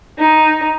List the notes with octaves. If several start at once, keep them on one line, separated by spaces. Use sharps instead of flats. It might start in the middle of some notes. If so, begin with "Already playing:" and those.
D#4